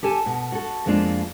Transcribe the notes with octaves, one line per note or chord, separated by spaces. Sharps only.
G4 A4 G#5 A5
B2
F#4 A4
F2 G#3 A#3 D4 F4